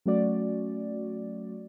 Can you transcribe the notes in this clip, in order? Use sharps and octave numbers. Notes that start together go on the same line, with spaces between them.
F#3 A3 C#4 F#4 D5